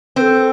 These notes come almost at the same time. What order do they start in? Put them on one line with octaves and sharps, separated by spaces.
C4 B4 A4